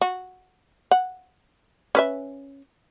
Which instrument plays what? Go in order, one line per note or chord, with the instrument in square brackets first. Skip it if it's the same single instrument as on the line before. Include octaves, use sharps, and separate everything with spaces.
[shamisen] F#4
F#5
C#4 B4 E5